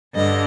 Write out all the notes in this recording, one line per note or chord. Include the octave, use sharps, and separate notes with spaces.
G2 D3 D#5